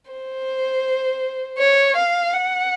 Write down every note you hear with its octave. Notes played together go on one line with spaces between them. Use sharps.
C5
C#5
F5
F#5